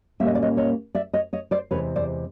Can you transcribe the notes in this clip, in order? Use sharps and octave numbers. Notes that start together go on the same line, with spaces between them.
A#2 G3 A#3 C#4 E5
D#5
D5
C#5 D#5
C#5 D#5
D5 E5
C#5 D#5
C#5 D#5
C5 D5
E2 C3 E3 G#3 B4 C#5
C5 D5